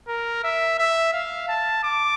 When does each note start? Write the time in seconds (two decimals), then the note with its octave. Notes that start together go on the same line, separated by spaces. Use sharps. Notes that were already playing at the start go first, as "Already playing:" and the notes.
0.08 A#4
0.44 E5
0.79 E5
1.13 F5
1.49 A5
1.84 D6